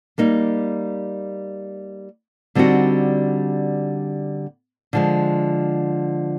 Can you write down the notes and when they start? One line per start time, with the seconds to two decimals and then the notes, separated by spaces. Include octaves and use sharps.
0.18 G3 A#3 D#4
2.55 D3 G3 C4 D#4 F#4
4.93 D3 F3 G#3